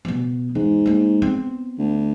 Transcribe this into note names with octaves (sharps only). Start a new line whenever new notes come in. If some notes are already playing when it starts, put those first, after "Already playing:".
B2 B3
E2 G#2
A#3 D#4
B3 C4
D2